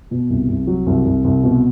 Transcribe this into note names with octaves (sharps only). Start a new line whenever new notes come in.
B2
C2
C2
F#3
C2
C2
C2
B2